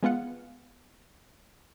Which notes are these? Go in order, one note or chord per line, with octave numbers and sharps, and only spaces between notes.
G#3 B3 F4 F#5